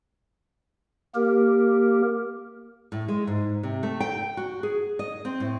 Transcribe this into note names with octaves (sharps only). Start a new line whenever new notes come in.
A#3 G4 A#4
A2
G#3
G#2
C3
A3
G5
F#4
G#4
D#5
C4
A2